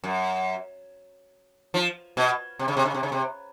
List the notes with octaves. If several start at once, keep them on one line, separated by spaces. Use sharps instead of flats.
F#2
F3
B2
C3
C#3
C3
C#3
C3
C#3
C3